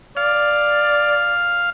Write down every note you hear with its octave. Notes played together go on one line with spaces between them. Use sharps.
D5 F5